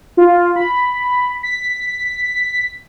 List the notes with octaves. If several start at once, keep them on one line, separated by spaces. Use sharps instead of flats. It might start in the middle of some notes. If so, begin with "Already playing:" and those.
F4
B5
B6